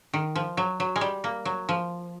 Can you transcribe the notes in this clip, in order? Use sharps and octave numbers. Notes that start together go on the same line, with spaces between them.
D#3
F3
F#3
F#3
G#3
G3
A#3
F#3
F3